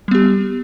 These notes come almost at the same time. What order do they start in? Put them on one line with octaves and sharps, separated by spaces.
G3 B3 G4